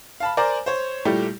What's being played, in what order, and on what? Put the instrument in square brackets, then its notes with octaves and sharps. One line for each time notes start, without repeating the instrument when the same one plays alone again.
[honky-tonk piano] F5 A5 B5
A#4 C5 D5 G#5 A#5
C5 C#5
A#2 G3 A3 E4 G4